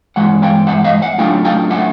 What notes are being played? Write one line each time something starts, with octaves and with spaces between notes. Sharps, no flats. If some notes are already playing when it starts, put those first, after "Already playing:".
G2 E3 G#3 F#5
F5 G5
E5 F#5
D#5 F5
E5 F#5
D3 F#3 A3 D4 F4 F5 G5
F5 G5
E5 F#5